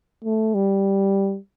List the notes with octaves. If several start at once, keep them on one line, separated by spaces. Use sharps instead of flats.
A3
G3